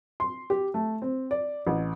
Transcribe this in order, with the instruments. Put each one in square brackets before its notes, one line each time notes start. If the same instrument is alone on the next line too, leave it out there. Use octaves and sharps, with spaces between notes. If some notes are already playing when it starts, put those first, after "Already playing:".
[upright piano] C6
G4
A3
C4
D5
A1